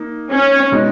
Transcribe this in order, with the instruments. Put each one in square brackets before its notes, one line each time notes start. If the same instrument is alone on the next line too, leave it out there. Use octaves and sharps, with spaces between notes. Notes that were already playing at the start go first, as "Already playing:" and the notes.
Already playing: [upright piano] A#3 D#4
[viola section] C#4
[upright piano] B2 G#3 D#4